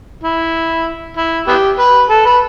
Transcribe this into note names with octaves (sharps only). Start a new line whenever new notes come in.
E4
E4
B3 E4 G4
B4
A4
B4